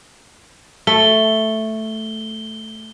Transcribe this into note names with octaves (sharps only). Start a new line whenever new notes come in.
A3 G7